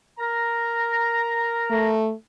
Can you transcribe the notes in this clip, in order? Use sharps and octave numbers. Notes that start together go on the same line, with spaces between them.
A#4 A#5
A3